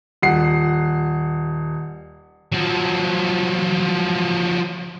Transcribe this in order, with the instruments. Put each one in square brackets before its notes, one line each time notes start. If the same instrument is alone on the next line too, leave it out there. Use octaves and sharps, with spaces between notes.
[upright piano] D#1 F#5 C7
[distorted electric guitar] F3 F#3